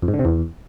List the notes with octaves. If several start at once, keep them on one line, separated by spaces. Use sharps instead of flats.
F2
G#2
D3
C3
E2